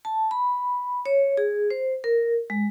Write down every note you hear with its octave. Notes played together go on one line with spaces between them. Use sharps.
A5
B5
C#5
G#4
C5
A#4
G#3